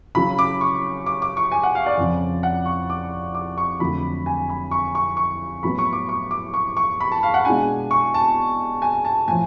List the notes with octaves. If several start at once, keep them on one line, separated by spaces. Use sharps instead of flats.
C#3 F#3 C#4 B5
D6
C#6
D6
D6
C#6
G#5
F#5
F5
D5
F2 C#3 F3
F#5
C#6
D6
D6
C#6
F2 D3 F#3 A3 B5
G#5
B5
C#6
C#6
C#6
A2 F#3 B3 B5
C#6
D6
C#6
D6
C#6
C#6
B5
A5
F5
F#5
B2 G#3 D4 G#5
C#6
A5
G#5
A5
A2 F3 G#5